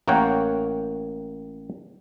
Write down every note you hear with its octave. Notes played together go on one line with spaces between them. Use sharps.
A1 A#3 A#4 C#5 F#5 G5